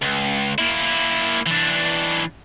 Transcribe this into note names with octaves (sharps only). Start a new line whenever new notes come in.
C#2
A#3 E4
E3 D4